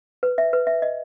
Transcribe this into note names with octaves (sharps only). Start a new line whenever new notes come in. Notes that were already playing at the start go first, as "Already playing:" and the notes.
B4
E5
B4
E5
D#5